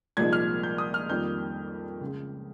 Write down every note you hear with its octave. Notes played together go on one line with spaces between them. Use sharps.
C2 A#2 F3 G#3 D#4 G#6
F6
G6
D#6
F6
F2 D#3 G3 A#3 G6
C#2 C#3 G#3